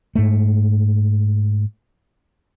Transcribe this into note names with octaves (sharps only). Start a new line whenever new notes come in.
G#2 A3